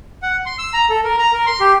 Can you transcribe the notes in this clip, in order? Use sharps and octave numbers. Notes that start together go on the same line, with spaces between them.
F#5
C6
E6
A#5
A4
A#4
A#5
A#4
C6
G4